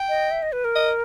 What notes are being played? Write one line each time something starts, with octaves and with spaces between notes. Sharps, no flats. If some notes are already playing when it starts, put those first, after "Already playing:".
Already playing: G5
D#5
E5
D#5
B4
A#4
D#5